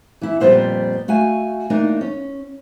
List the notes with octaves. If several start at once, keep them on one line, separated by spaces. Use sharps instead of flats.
E3 E4
F2 A#2 G3 B3 C5 F#5
A3 F#4 F5 G#5
E3 A3 A#3 D4 D#4
C#4